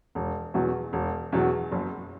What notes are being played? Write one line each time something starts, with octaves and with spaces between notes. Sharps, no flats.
E1
E2 B2 F#3
E1
E2 B2 F#3
F#1